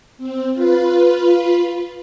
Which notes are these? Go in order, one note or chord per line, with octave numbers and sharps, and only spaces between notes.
C4
F4 B4